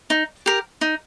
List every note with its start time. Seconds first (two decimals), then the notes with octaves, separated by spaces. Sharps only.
0.10 D#4
0.46 G4 A#4
0.81 D#4